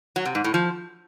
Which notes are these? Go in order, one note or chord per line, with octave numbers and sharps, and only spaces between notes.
F#3
C3
G#2
A2
F3